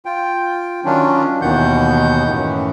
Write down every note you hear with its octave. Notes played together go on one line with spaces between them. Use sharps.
F4 G5
D#3 F#3 C#4 D4 F4
D#2 B2 D#3 E3 F#5 G6
F#2 A2 D#3 E3